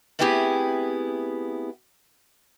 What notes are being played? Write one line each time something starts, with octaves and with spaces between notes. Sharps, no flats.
A3 B3 C4 E4 G4 G#4